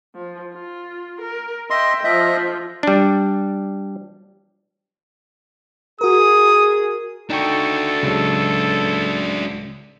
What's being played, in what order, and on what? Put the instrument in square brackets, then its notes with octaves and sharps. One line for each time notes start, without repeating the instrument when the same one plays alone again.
[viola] F3
F4
A#4
[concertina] D#5 C6 [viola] E5 G5
[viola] F3 [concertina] D#5 E5
[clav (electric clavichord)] G3 D4
[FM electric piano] F#4 A#4 [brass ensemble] G#4 [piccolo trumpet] D#6
[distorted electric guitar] D4 F#4 [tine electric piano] D#4 G5 C#6 [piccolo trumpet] A4
[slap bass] C#2 A2 [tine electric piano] C#3 F#3